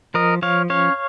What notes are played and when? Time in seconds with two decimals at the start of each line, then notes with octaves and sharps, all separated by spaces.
0.14 F3 A#4 D#5
0.42 F3 C#5 F5
0.70 C#4 C#5 F5